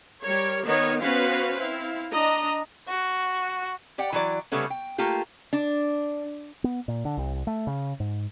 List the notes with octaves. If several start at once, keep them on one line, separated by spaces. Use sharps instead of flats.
G3 A#4 C#5
D#3 B3 D#4 A#4 C#5
B3 C#4 F#4 B4 C5 F5
C4 E4 F5
D4 D#5 A#5
F#4
G4 D5 F#5 G5
E3 F#3 D5
C#3 G3 A3 B3 C#4
G5
A3 A#3 F4 G4
D4
B3
A#2
D3
C2
A3
C#3
G#2